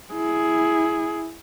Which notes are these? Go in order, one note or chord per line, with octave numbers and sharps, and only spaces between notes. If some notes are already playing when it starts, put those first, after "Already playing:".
E4 G#4